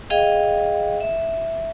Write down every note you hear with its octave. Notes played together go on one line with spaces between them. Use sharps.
G#4 D#5 F5 G5
E5